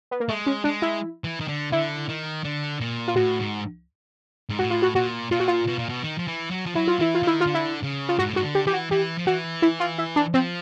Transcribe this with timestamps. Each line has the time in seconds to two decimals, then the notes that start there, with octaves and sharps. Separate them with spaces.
0.11 B3
0.20 A#3
0.28 G#3 A3
0.46 C#4
0.64 G#3 D4
0.82 E4
1.24 E3
1.40 D#3
1.48 D3
1.72 D3 E4
2.09 D#3
2.44 D3
2.81 A#2
3.08 F4
3.16 A2 F#4
3.39 G#2
4.49 G#2
4.59 A2 F#4
4.70 F4
4.82 F#4
4.95 A#2 F#4
5.31 A#2 F4
5.40 F#4
5.48 F4
5.67 B2
5.79 A#2
5.89 B2
6.03 D#3
6.18 F3
6.28 E3
6.51 F#3
6.66 F3
6.75 F#3 E4
6.88 F4
6.99 E3 E4
7.15 F4
7.23 D#3 E4
7.41 F4
7.46 D3
7.55 E4
7.83 C#3
8.09 F4
8.19 G#2 F#4
8.26 A2
8.34 G#2 F#4
8.42 D3
8.55 G4
8.67 E3 G4
8.73 F#4
8.91 E3 G4
9.18 F3
9.27 E3 F#4
9.62 E4
9.80 F4
9.98 E4
10.16 D4
10.34 F3 C4